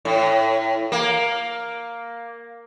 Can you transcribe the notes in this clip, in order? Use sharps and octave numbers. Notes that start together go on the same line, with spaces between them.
A2
A#3